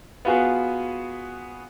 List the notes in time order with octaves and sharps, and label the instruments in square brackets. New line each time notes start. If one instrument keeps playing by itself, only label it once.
[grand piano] B3 F4 F#4 G#4 B4